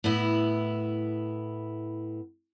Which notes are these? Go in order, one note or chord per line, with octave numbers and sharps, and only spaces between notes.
A2 B3 E4